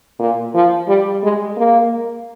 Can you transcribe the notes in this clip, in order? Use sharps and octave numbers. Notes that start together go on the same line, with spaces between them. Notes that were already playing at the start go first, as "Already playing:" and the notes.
A#2
F3
G3
G#3
A#3